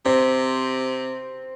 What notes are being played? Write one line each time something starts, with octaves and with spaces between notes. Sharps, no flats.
C3 C4